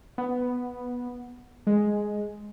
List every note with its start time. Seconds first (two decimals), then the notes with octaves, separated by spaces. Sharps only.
0.18 B3
1.67 G#3